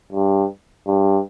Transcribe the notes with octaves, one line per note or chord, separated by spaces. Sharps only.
G2
G2